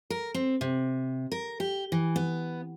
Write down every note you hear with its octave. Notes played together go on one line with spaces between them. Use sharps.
A#4
C4
C3
A#4
G4
E3
B3